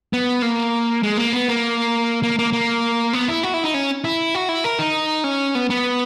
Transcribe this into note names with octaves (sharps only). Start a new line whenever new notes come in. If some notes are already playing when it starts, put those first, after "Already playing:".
B3
A#3
G#3
A#3
B3
A#3
A#3
A#3
A#3
B3
E4
F#4
E4
D#4
C#4
E4
F#4
E4
A#4
D#4
C#4
B3
B3